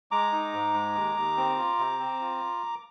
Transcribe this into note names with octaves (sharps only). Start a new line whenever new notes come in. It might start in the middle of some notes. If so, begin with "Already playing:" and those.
G#3 A#5 D6
D#4
G#2
G#3
D#2
D#2
C4
F4
C3
C4
F4